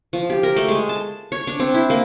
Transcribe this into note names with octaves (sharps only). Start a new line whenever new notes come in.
F3
G4
A#4
A3
G#3
A5
C#5
D4
C4
E4
A#3